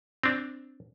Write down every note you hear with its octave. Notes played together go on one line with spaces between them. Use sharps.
C4 D4